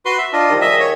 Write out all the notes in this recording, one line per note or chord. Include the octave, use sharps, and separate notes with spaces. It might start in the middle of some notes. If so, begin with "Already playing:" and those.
F#4 B4 C6
E5
D4 F4 D#5
D#3 F3 G3
D#3 G#4 D#5 E5
C#5